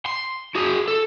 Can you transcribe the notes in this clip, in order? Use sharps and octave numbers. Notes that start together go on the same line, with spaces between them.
C6
F#4 G#4
A4